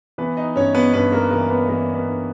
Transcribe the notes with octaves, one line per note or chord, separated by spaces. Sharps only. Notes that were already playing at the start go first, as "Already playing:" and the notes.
E3 B3 B4
D#4 D#5
G2 C#4 C#5
B3 B4
G2 B3 B4
A#3 A#4
E3 A#3 A#4
B3 B4
E3 A#3 A#4
B3 B4
G2